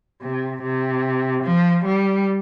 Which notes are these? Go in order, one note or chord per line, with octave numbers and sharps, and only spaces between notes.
C3
C3
F3
G3